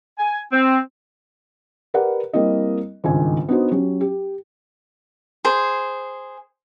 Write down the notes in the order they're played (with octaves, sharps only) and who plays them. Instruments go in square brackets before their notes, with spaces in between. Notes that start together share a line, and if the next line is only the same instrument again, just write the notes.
[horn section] G#5
C4
[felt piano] G4 A#4 B4 D5 F#5
G3 A#3 C4 E4 D#5
G#1 C#2 G2 D#3 G#5
B3 D4 D#4 F#4 C5
F#3 C#4 G4
G4
[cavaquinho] G#4 C5